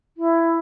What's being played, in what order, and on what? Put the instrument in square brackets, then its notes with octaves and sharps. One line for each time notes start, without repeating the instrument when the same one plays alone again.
[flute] E4